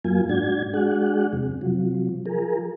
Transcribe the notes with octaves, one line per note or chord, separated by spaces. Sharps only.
F#2 F#3 A#3 F4 G#5
G#2 D4 F#4 G#6
G#3 D4 F#4 G#4 F#5
F2 C3
C3 F3 F#3
F3 G#4 A#4